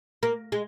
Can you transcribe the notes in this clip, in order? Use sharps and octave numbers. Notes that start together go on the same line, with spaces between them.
A#3
G#3